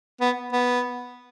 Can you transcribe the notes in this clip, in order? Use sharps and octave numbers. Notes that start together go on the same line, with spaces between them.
B3
B3